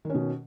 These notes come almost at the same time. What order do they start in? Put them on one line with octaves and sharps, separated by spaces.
D#3 C#4 B2